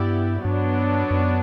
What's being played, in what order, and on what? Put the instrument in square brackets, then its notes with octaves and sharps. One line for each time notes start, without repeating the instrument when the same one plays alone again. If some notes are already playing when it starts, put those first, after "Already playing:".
Already playing: [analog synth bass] G2 [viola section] B3 E4 G4 D5
[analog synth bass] G2 [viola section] F#3 B3 D4
[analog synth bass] F#2